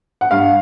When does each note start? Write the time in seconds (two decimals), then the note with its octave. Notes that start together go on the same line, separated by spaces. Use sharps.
0.21 F#5
0.31 G2 F5